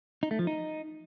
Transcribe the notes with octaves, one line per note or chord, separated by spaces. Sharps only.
D#4
A3
F3
D#4